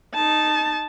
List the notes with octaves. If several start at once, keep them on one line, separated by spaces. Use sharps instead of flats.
D#4 A5